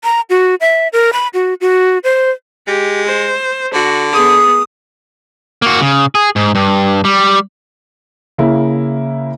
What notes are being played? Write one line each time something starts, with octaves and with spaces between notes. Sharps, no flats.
A#5
F#4
E5
A#4
B5
F#4
F#4
C5
G#3 G4
C5
D3 F#4
B3 G#4 D#6
A#3 F#4
C#3
G#4
G#2
G2
G3
C#3 A#3 E4